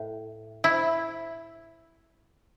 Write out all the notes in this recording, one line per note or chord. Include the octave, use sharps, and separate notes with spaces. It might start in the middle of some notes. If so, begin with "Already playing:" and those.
Already playing: A2
E4